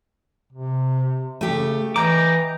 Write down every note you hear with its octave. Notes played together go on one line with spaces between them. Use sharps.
C3
C#3 A3 G4
E3 D#5 G5 A#5 D6